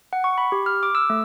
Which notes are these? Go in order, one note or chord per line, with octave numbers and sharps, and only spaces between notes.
F#5
C#6
B5
G4
F6
D6
E6
A3